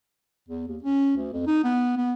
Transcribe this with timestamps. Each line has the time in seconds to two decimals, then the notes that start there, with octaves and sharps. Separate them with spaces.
0.48 E2
0.68 D#2
0.83 C#4
1.17 D2
1.33 F2
1.47 D#4
1.64 B3
1.97 B3